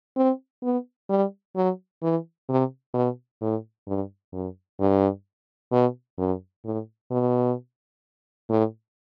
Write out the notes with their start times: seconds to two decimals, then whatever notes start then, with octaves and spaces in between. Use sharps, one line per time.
0.16 C4
0.63 B3
1.09 G3
1.56 F#3
2.02 E3
2.49 C3
2.94 B2
3.41 A2
3.87 G2
4.33 F#2
4.80 G2
5.72 B2
6.18 F#2
6.65 A2
7.11 B2
8.49 A2